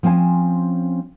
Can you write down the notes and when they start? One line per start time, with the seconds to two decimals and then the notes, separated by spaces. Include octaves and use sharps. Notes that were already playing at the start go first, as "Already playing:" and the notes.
0.03 F3 C4 C#4 E5 G#5